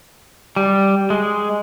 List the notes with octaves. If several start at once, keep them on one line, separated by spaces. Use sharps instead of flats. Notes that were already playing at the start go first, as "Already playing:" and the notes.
G3
G#3